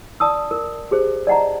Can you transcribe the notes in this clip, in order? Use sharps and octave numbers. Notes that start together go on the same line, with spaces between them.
D5 A5 D#6 E6
A#4
G4 G#4 C5
D5 D#5 F#5 A5 A#5